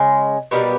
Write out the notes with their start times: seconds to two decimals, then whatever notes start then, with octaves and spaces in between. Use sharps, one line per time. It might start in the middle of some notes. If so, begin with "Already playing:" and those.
Already playing: C#3 G#3
0.51 B2 G3 A#3 B3